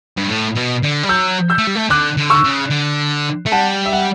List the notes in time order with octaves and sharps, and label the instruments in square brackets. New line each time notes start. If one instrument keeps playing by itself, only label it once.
[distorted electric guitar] G2
A2
B2
D3
G3
[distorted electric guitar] F#3 [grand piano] E6 G6
[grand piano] E6 G6
[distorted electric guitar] A3
G3
A3
[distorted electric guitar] D3 [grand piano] D6 F#6
[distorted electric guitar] D3
[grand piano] C#6 E6
[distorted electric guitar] C#3
D3
A3
[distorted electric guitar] G3 [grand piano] F#5 A5
[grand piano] E5
F#5